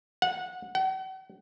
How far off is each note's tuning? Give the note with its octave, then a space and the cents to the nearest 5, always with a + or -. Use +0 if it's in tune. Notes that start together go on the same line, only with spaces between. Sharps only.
F#5 -20
F#5 +45